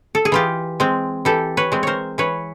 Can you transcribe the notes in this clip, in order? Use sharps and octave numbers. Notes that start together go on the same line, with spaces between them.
A4
G#4
E3 F4 G4
G#3 C4
E3 G4 A4
B4 C#5
G#3 C4
A#4 C5 C#5
E3 B4 C#5